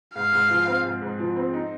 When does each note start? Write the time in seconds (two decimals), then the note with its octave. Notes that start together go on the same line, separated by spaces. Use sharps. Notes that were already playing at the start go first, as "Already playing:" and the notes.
0.15 G#2 F5
0.32 G#2
0.50 F3
0.67 C4
0.85 G#2
1.01 G#2
1.19 F3
1.36 C4
1.53 D#4